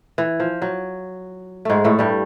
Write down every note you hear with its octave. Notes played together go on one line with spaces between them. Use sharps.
E3
F3
F#3
G#2 G#3 A3
A2 A3
G2 G3